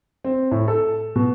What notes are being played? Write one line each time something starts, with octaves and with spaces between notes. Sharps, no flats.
C4
A2
A4
B2